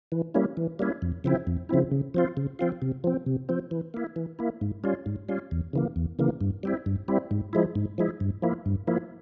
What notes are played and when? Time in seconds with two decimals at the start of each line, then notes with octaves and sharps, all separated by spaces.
0.12 E3
0.34 G3 A#3 C#4 E4
0.57 E3
0.79 G3 A#3 C#4 E4
1.02 F2
1.24 C#3 F3 C4 E4
1.47 F2
1.69 C#3 F3 C4 E4
1.91 C#3
2.14 F3 C4 F4
2.37 C#3
2.59 F3 C4 F4
2.82 C3
3.04 F3 C4
3.26 C3
3.49 F3 C4
3.71 E3
3.94 A#3 E4
4.16 E3
4.39 A#3 E4
4.61 G#2
4.84 G3 C#4 F4
5.06 G#2
5.29 G3 C#4 F4
5.51 E2
5.73 C#3 E3 A#3
5.96 E2
6.19 C#3 E3 A#3
6.41 G2
6.63 G3 C4 E4
6.86 G2
7.08 G3 C4 E4
7.31 G#2
7.53 F3 G#3 E4
7.75 G#2
7.98 F3 G#3 E4
8.20 G2
8.42 F3 A#3 E4
8.66 G2
8.87 F3 A#3 E4